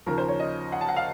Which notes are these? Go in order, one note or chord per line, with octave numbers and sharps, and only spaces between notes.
D#2 C#3 F3 A#4
C5
C#5
D#5
F#5
A5
F#5
F5